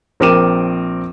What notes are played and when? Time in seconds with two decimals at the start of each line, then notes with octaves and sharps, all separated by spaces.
0.20 A#1 C4 A#4 D6 D#7 E7